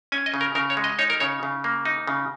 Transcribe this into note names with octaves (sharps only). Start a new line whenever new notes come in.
C#4 G#5
D#5
C#3
A#4
C#3 A#4
C#5
G#3
D#5
D#4 C#5
A#4
C#3 C#5
C#3
A#3
D#4
C#3